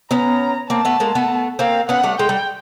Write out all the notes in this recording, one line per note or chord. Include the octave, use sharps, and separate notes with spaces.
B3 C#4 A#5
A#3 C4 A5
A3 B3
G#3 A#3
A3 B3
A#3 C4 F5
B3 C#4 F#5
G3 A3
G#3 G5
G3